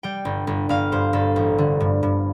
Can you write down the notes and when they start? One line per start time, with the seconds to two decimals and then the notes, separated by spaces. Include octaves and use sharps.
0.03 G3 G5
0.25 G1
0.47 G1
0.69 G1 F5
0.92 G2 C5
1.13 G1 A4
1.36 A1
1.58 D3
1.80 G2
2.03 G2